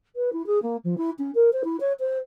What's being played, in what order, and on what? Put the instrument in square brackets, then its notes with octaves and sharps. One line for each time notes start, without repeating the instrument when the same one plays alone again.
[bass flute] B4
E4
G#4
A#3
F3
E4
C#4
A#4
C5
E4
C#5
C5